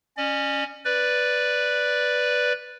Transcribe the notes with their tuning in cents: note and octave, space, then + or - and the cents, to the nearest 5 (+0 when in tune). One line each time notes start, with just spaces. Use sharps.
C#4 +0 D5 +45
B4 +0 D5 +0